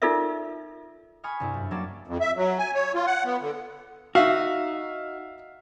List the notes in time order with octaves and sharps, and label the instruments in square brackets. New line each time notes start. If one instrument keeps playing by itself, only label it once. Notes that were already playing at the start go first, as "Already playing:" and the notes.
[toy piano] D#4 F4 A4 A#4 D5 E5
[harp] G#5 B5 C#6 D#6 F6
C2 G2 E4
F#2
F#3 G3 A#3 C#4 D5 A5
[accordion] F2
E5
F#3
G#5
C#5
F4
F#5
B3
D3
[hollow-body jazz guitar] D#4 F#4 [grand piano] E5 F5